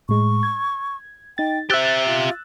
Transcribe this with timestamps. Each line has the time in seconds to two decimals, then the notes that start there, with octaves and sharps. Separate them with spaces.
0.09 A2 G#3 C#6
0.43 G#6
1.38 D#4 G5 A6
1.70 G4 C5 E5 E6 F#6 A6
2.06 F4